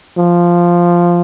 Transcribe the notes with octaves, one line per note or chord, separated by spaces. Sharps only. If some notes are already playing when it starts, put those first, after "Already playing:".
F3